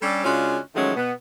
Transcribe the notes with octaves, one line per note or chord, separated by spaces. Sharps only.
G3 C#4 D4 G4 A4
C#3 G#3 C#4 D4 F4 F#4
D#3 F3 F#3 G#3 A3 C#4
B2 B3